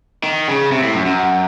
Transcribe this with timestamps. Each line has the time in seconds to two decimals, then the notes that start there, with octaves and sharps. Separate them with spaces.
0.24 D#3
0.48 C#3
0.72 C3
0.83 A2
0.95 F#2
1.06 F#2